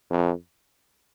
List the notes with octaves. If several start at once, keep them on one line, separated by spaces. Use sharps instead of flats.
F2